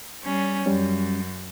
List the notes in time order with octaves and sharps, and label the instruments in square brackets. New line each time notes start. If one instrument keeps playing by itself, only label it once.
[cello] G3 C#4
[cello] F#2 [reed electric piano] G3 C#4